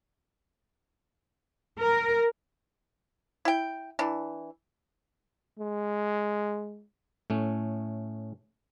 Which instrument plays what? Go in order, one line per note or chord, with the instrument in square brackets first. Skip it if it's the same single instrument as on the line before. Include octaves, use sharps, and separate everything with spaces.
[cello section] A#4
[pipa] E4 G5
E3 D4
[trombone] G#3
[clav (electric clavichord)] A2 A3 C#4